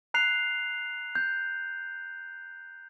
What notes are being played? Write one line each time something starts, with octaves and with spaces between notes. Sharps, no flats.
A#5 F#6 C7 F7
G6